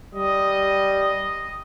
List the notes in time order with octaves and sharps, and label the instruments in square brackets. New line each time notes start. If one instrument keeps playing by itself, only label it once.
[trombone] G3 [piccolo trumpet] D#5